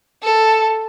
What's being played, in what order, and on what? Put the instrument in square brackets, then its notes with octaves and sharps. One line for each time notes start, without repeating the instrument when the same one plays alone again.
[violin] A4